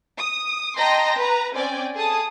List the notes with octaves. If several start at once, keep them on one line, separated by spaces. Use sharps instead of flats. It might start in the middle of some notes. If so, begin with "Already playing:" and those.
D#6
D#5 G5 A5 A#5 C6 A#6
B4 A#5
C4 C#4 D5 G5 G#5
G#4 A4 A5 D#6